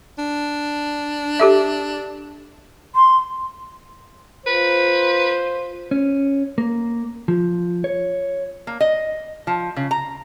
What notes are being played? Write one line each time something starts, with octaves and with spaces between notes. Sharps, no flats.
D4
G4 A4 E5
C6
F4 B4 C5
C#4
A#3
F3
C#5
A#3
D#5
F3
C#3
A#5